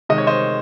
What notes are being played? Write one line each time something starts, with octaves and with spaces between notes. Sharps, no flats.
C3 D#3 G#3 D#5
C#5
C5 D#5